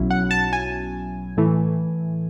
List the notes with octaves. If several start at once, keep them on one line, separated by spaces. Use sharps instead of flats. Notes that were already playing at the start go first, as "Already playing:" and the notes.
Already playing: B1 B2 F#3 C#4 E4
F#5
A5
G#5
A2 E3 A3